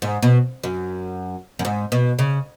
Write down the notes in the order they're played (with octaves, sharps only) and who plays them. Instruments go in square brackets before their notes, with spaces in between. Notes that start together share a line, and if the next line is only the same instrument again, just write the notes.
[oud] G#2
B2
F#2
F#2
G#2
B2
C#3